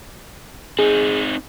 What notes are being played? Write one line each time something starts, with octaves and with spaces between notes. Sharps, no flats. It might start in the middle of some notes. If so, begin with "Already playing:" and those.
C4 D#4 G#4